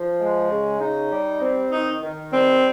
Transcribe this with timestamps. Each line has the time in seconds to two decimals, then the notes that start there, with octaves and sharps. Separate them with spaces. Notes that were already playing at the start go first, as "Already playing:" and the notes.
Already playing: F3
0.20 G#3
0.50 C#3
0.81 D#4
1.11 G3
1.41 C4
1.72 D#3 D#4
2.03 D#3
2.33 G3 C4